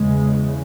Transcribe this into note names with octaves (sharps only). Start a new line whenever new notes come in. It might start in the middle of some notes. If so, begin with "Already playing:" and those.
Already playing: E2 C#3 G#3